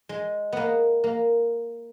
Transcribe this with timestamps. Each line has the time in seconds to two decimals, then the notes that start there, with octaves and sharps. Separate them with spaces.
0.09 G#3
0.53 A#3 B3
1.04 A#3